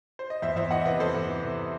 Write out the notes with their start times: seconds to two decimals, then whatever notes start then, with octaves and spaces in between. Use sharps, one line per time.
0.19 C5
0.30 D#5
0.42 E2 C5 E5
0.56 E2 C5 E5
0.71 E3 D#5 F#5
0.81 E5
0.85 C3 B4 D#5
0.99 E2 A4 C5
1.15 E2
1.29 E3
1.43 C3